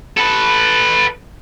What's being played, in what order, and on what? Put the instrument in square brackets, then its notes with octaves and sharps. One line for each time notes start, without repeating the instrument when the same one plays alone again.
[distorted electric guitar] A4 B4